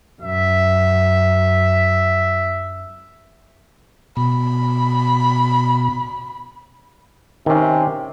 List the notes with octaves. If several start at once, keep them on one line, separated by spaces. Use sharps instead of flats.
F#2 E5
B2 B5
C3 D#3 C#4